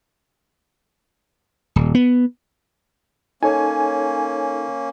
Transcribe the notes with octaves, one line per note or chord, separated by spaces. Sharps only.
D#1
B3
A#3 C#4 D#4 A4 C#5 G#5